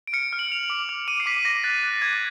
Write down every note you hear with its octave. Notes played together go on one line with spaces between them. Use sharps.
D7
F6 C#7
F6
F#7
F6 F7
F#7
D6
F6 F7
D6 D#7
C7
D6 B6
D6 A#6
F#6 A6
F#6
D6 G#6